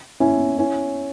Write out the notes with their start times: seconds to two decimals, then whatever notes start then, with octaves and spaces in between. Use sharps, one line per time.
0.20 C#4 E4
0.58 C#4 E4